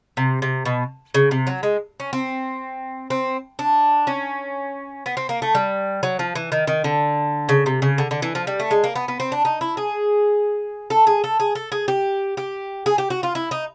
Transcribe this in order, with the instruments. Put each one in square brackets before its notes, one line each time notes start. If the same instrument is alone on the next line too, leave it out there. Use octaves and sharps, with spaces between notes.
[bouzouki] C3
C3
B2
C#3
C3
F#3
G#3
C#4
C4
C4
D4
C#4
B3
C4
A#3
A3
G3
F#3
F3
E3
D#3
D#3
D3
C#3
C3
C#3
D3
D3
E3
F3
G3
A3
G#3
A#3
B3
B3
C4
D4
D#4
E4
G#4
A4
G#4
A4
G#4
A4
G#4
G4
G4
G#4
G4
F#4
F4
E4
D#4